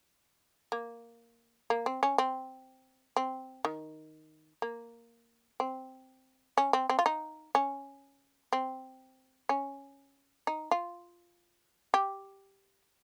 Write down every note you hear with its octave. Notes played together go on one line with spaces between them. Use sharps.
A#3
A#3
C4
C#4
C4
C4
D#3
A#3
C4
C#4
C4
C4
F4
D#4
C#4
C4
C#4
D#4
F4
G4